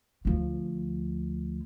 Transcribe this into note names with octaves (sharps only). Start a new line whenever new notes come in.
D2 F3